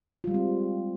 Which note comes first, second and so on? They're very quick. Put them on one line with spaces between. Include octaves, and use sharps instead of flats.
F4 G3 G#3 C4